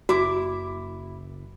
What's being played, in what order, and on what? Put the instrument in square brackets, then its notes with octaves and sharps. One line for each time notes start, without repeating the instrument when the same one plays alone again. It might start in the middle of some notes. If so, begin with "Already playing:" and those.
[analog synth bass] F#1 [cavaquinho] E4 D6 [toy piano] F#4